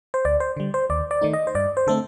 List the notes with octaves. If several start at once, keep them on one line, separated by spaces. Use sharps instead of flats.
C5
D2 D5
C5
D3 G3
C5
D#2 D5
D5
D#3 A3 D#4
D#5
C5
G2 D5
C5
D3 A3 C4 A4